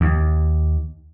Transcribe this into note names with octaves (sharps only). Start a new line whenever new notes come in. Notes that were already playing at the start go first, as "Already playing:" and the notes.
D#2